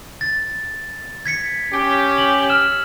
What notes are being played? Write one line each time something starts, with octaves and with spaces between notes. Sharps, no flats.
A6
G#6 B6 C#7
C#4 G4
F#7
E6 F6 E7